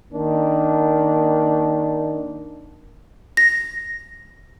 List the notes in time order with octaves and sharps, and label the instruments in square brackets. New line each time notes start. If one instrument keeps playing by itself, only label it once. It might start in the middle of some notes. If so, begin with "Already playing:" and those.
[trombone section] D#3 A#3 D4
[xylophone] A#6